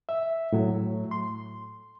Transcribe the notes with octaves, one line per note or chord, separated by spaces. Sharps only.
E5
A2 F#3
C6